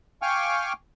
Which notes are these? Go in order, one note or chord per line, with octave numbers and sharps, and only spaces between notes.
F5 G5 G#5 C#6 D6 F6